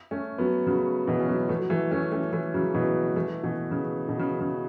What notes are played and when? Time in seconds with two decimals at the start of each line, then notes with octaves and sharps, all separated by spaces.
0.11 A3 C#4
0.38 F#3 B3
0.67 C#3 F#3
1.07 B2 E3
1.20 C#4
1.29 F#3 B3
1.49 E3 A3
1.61 F#3
1.70 E3 A3
1.91 A3 C#4
2.12 A3 C#4
2.33 E3 A3
2.54 C#3 F#3
2.74 B2 E3
3.16 E3 A3
3.43 B2 E3
3.71 C#3
4.08 B2
4.19 C#3
4.40 C#3